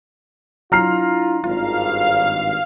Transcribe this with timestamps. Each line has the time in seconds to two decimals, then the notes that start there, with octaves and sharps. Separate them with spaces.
0.72 F#3 D4 E4 F4 A#5 F6 C7
1.44 G#1 G2 F4 F5